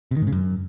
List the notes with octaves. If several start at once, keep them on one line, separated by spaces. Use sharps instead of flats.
C3
D#3
G#2
C#3
F#2